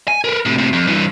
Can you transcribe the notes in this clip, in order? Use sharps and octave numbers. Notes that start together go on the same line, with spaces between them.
G#5
A#4 B4
A2 C3
A2 C3
F2
G2 E3